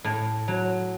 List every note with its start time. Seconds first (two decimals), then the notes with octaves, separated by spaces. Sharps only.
0.04 A2
0.48 F#3